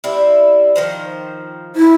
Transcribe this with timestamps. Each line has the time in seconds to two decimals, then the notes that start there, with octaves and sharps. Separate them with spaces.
0.04 G3 C4 E4
0.76 D#3 F3 C5
1.76 E4